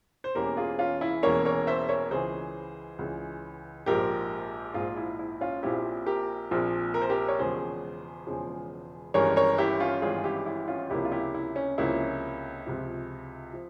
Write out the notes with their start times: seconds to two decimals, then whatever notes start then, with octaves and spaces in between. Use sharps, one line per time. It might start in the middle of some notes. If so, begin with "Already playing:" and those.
0.24 C5
0.35 E1 E2 E3 A#3 C#4 G4 A#4
0.57 F4 G#4
0.79 C#4 F4
1.01 E4
1.23 E1 E2 E3 A#3 C#4 A#4 C#5
1.45 A#4 C#5
1.67 C5 E5
1.89 A#4 C#5
2.11 C#2 C#3 E3 G#4 C5
2.99 C#2 C#3 E3
3.86 A#1 G#2 F3 G4 A#4
4.74 A#1 G#2 F3 F4 G#4
4.97 E4
5.19 E4
5.41 C#4 F4
5.63 A#1 A#2 F3 C4 E4 G4
6.06 G4 A#4
6.51 A#1 A#2 F3 C4
6.94 A#4
7.02 C5
7.09 G4 A#4
7.28 C#5
7.38 E1 E2 C#3 F3 G#3 G#4 C5
8.27 E1 E2 C#3 F3 G#3
9.14 G#1 G2 E3 G#3 C#4 A#4 C#5
9.36 A#4 C#5
9.58 E4 G4
9.80 C#4 F4
10.02 G#1 G2 E3 G#3 C#4 F4 G#4
10.24 E4 G4
10.46 E4
10.68 C#4 F4
10.90 C#2 C3 F3 A#3 C#4 E4 G4
11.05 F4
11.12 E4 G4
11.34 E4
11.56 C#4
11.78 C#2 C3 F3 A#3 C#4 E4
12.67 C#2 C3 F3
13.53 F3